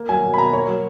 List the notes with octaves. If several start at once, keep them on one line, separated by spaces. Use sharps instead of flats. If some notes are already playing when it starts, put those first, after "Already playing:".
Already playing: A#3
F#3 G#5
B2
B5
B2 A#5
A#3 C#5
F#3